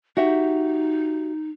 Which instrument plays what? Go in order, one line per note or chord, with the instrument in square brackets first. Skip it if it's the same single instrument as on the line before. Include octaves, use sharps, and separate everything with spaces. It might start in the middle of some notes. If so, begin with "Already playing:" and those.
[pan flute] D#4 [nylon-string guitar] F#4 G4 E5